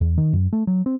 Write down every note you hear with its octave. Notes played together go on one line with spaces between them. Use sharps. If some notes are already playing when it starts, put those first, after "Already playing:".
E2
D#3
F#2
A3
F#3
C4